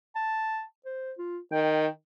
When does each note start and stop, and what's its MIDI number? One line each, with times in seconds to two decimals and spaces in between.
0.16 0.63 81
0.85 1.13 72
1.18 1.39 65
1.52 1.87 51
1.52 1.89 79